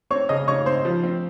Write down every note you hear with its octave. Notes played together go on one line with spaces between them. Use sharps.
C4 C#5 C#6
C#3 D#5 D#6
C#3 C#5 C#6
C4 C5 C6
F3
C4